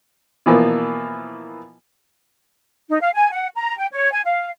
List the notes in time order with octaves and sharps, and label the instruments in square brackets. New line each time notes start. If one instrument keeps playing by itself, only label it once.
[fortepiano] B2 E3 F3 A#3
[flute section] D#4
F5
G#5
F#5
A#5
G5
C#5
G#5
F5